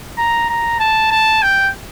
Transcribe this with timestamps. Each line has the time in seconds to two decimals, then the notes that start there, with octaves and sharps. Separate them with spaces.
0.18 A#5
0.49 A#5
0.80 A5
1.11 A5
1.42 G5